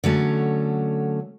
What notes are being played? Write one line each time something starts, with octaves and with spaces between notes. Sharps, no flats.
D3 F#3 A3 C#4